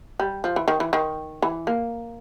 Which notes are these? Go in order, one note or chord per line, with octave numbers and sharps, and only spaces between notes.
G3
F3
E3
D#3
E3
D#3
E3
A#3